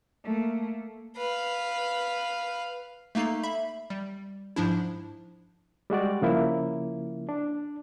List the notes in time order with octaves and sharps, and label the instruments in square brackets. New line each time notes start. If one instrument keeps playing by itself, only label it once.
[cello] A3 A#3
[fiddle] B4 F5
[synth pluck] A3 A#3 D#4 A4 C7
E5 B5
G3
G#2 F3 D4 E4
[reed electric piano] G3 G#3 F#4 D5
C#3 F3 A#3 E4
D4